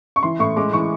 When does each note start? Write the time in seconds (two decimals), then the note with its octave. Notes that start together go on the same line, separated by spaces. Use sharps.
0.16 C#6
0.23 E3 C6
0.39 A2 C#6
0.56 G#3 D6
0.73 E3 C#6